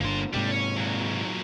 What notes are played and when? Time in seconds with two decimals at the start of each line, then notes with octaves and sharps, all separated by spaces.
0.01 G1 D3 A#3 C6
0.34 G#2 C3 G3 D4
0.52 C#4 C#5
0.77 A#2 F#3